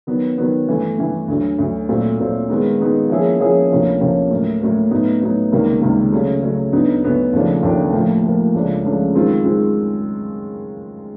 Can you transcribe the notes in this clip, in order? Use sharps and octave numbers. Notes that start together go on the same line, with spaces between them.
D#3 F#3 B3
D#3 F#3 B3
G2 E3 A3
G2 E3 A3
D2 D3 F#3
D2 D3 F#3
A#2 F#3 A3 C4
A#2 F#3 A3 C4
D#3 G#3 B3 D#4
D#3 G#3 B3 D#4
F3 A#3 C#4 E4 G#4
F3 A#3 C#4 E4 G#4
D2 C3 F3 A#3 C#4
D2 C3 F3 A#3 C#4
A2 F#3 A#3
A2 F#3 A#3
A2 F#3 B3 D#4
A2 F#3 B3 D#4
C#2 C3 D#3 G3 A#3
C#2 C3 D#3 G3 A#3
C#3 F#3 A3
C#3 F#3 A3
D2 D3 F#3 B3 D#4
D2 D3 F#3 B3 D#4
D#2 C#3 F3 A3 D4
D#2 C#3 F3 A3 D4
A2 F3 A#3
A2 F3 A#3
C#2 C#3 F3 A3 D4
C#2 C#3 F3 A3 D4
F#2 D#3 G#3 C4 F4
D#3 G#3 C4 F4